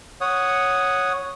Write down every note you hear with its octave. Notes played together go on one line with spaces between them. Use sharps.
C#5 F#5 D#6